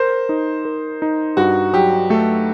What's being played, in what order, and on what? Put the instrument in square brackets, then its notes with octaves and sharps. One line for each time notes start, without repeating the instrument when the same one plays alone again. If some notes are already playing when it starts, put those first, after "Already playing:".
Already playing: [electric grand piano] A#4 [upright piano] C5
[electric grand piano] D#4
A#4
D#4
[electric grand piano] G2 [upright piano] F#4
[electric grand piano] F#3 [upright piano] G4
[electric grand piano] A3 [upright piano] A4